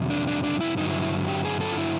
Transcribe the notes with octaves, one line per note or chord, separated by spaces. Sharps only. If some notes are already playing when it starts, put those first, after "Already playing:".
Already playing: F2 C3 D#3 F#3
D4
D4
D4
E4
G2 D3 F#3 D#4
E4
E4
G4
G#4
A4
F4
E4